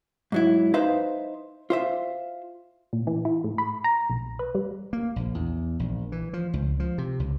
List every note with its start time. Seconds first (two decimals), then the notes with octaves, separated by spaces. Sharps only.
0.32 G#2 F#3 E4
0.74 D#4 B4 C5 E5 F5
1.70 F4 C5 E5
2.93 A#2
3.07 E3
3.25 E4
3.44 A2
3.58 B5
3.84 A#5
4.10 B1
4.39 B4
4.55 G3
4.93 A#3
5.16 A#1
5.35 E2
5.79 A#1
6.12 E3
6.33 F3
6.53 C#2
6.80 F3
6.98 C3
7.20 C#2